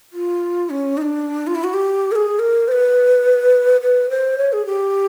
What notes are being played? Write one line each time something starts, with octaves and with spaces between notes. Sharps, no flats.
F4
C#4
D#4
D4
F4
E4
F#4
G4
A#4
G#4
A#4
C5
B4
B4
C5
C#5
G#4
G4